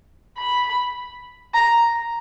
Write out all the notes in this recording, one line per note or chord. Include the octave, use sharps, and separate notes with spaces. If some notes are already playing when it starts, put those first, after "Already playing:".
B5
A#5